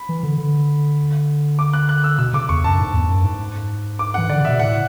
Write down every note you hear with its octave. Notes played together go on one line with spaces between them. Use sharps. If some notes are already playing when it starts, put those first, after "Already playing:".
Already playing: B5
E3
D3
D3
D6
F#6
F#6
E6
B2 E6
C#3 D6
E2 C#6
F#2 A5
G#2
E2
F#2
G#2
D6
F#5
E3
D3 D5
C#3
E5
B2
A2 F#5